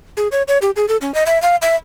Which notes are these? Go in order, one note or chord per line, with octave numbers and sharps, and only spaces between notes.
G#4
C#5
C#5
G4
G#4
A4
C#4
D#5
E5
F5
E5